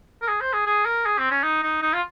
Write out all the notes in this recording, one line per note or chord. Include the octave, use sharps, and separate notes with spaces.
A#4
G#4
C5
G#4
G#4
A#4
G#4
C4
C#4
D#4
D#4
D#4
F4